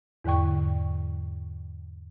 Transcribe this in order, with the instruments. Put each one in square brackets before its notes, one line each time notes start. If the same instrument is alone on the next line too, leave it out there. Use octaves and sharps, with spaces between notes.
[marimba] E2 G#2 D3 G5 C#6